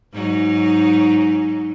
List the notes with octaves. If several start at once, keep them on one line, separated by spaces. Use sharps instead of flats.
G#2 F#3 D#4